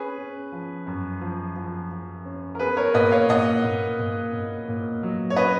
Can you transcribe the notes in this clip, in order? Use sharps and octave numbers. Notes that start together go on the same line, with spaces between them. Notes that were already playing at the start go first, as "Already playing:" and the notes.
Already playing: C#4 G#4 B4
C#4
F3
F#2
F3
F3
F3
C#4
A#4
B3 G#4 B4
A#4 C#5
A#2 B4 D#5
C#5 F5
A#2 D#5 F#5
A#2
A#2
A#2
A#2
F#3
C#5
C#4 B4 D#5